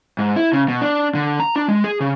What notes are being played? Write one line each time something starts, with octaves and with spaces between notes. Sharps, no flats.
G#2
E4
C#3
B2
D4
D3
A#5
D4
G#3
G#4
C#3